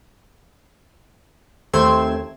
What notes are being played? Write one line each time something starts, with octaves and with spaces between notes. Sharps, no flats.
D#2 A3 C4 C6 G#6 E7